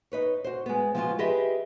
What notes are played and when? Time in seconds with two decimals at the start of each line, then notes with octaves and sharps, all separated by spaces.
0.12 D#4 B4 C#5
0.44 F#4 C5
0.66 G#3 B3
0.95 F3 G#3 B3 C#4 F4 F#4
1.19 G4 G#4 B4 D#5 E5